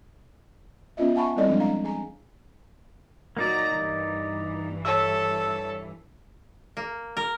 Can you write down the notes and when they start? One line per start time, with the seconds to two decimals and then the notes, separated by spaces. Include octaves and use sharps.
0.97 B3 C#4 F4 D#5 E5
1.15 E5 F#5 G#5 A5 B5 C#6
1.36 G3 C4 E4 A4 D5 D#5
1.48 F3 F#3 G#3 D4
1.60 F5 A#5
1.84 G#4 G#5 A#5
3.37 A#1 F#3 A#3 D#4 D5 A#5
3.74 G2 E3
4.85 A4 C#5 E5 E6
6.77 A#3
7.17 A#4